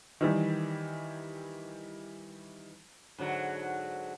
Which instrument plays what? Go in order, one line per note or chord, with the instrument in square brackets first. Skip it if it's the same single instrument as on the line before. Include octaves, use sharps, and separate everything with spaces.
[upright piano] D#3 E3 G3
[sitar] G#2 D3 F#3